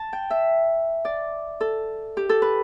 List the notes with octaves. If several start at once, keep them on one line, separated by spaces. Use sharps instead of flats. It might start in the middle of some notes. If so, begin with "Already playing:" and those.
Already playing: A5
G5
E5
D5
A4
G4
A4
B4